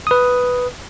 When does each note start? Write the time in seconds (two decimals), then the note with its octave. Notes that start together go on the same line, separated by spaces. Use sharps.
0.07 B4 D#6